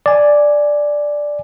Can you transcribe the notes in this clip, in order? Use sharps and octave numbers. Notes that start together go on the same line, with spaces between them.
D5 G#5